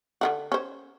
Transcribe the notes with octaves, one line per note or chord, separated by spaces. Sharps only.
D3 D#3 F#4
C#4 C5